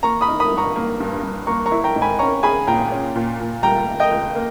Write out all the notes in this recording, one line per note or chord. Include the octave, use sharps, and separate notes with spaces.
A#3 A#5 C#6
B5 D#6
D#4
B5 D#6
G2
A#5 C#6
A#3
G2
G2
A#3 A#5 C#6
A#5 C#6
E4
G5 A#5
G#2
G#5 B5
C#4 A#5 C#6
G#4 G#5 B5
A#2 G5 A#5
C#4
A#2
A#2
G3 G5 A#5
C#2
D#5 G5
C#2
A#3